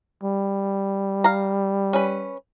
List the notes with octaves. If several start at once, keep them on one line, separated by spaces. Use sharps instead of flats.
G3
F5 A#5
C#4 B4